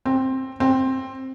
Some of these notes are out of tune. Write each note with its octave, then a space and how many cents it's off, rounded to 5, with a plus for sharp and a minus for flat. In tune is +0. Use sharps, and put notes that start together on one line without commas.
C4 +10
C4 +10